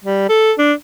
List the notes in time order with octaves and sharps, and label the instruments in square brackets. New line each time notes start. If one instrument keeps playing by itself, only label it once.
[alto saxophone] G3
A4
D4